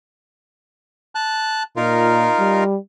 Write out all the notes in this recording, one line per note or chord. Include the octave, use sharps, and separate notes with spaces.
A5 F#6
A#2 D#4 F4 A#4
G3